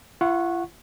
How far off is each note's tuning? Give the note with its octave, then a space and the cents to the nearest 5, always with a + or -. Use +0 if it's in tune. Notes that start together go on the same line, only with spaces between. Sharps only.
F4 -45 F#5 -5 C#6 -20